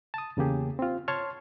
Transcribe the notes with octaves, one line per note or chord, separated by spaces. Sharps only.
A5 D#6
E2 C#3 A#3 G4 G#4
C4 F4
C#5 A5 C6 C#6 F6